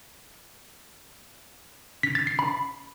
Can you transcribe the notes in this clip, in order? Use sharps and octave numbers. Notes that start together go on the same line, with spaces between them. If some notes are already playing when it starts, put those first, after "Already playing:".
B6
A6
C7
B5